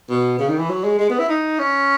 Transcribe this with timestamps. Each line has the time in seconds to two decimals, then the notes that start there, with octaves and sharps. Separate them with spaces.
0.10 B2
0.39 C#3
0.49 D#3
0.59 E3
0.70 F#3
0.84 G#3
0.99 G#3
1.10 B3
1.19 E4
1.29 D#4
1.59 C#4